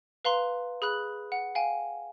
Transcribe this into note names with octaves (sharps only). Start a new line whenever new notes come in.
B4 F5 A#5 C6
G#4 B5 F#6 F#7
F#5
F5 G5 G#5